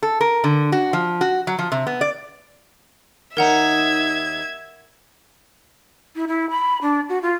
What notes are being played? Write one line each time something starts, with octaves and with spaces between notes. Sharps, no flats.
A4
A#4
D3
F#4
F3
F#4
F#3
F3
C3
B3
D5
D#2 D#4 A#4 E5 F#5 A#5 G#6
E4
E4
B5
D4
F#4
F4